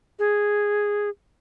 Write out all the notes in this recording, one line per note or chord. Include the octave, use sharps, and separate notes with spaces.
G#4